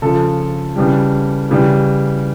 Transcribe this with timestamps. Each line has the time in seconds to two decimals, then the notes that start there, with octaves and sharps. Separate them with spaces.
0.02 C#3 F3 A4
0.76 C#3 E3 G3
1.51 C#3 E3 G3